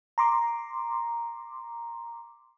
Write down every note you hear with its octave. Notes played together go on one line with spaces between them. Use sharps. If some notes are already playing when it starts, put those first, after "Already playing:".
A#5 C6 D6